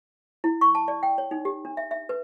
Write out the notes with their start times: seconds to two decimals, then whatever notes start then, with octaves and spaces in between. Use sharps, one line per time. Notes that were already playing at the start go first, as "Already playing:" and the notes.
0.44 E4
0.61 C#6
0.75 A5
0.88 D5
1.03 G5
1.18 C#5
1.31 D#4
1.45 G4
1.65 D4
1.77 E5
1.91 E5
2.09 B4